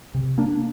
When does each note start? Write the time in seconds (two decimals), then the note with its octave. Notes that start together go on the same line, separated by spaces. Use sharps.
0.14 C3
0.38 A#3 D4